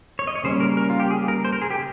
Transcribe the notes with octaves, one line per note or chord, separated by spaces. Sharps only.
C#5
D#5
C#5
C#3 G3 A#3 C#4 C5
A#4
A#4
F4
G4
G#4
A#4
C5
A#4
G#4
G4